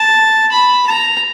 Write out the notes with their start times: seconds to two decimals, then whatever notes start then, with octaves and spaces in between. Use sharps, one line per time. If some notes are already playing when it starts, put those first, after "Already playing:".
Already playing: A5
0.52 B5
0.87 A#5